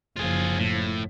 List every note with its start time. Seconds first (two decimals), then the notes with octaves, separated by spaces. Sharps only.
0.16 F#1 F3 F4 G#4
0.59 A2